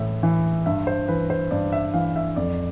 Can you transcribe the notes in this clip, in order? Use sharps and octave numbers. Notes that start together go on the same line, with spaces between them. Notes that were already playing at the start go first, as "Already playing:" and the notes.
Already playing: A2 E3 E5
E3
G2 E5
C5
E3 B4
C5
G2 D5
E5
E3 F5
E5
F2 D5